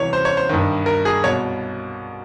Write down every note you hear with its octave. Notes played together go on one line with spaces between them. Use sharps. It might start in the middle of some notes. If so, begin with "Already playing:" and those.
Already playing: C2 C3 E3 C#5
C5
C#5
C5
G2 D#3
A#4
G#4
C2 B2 C#5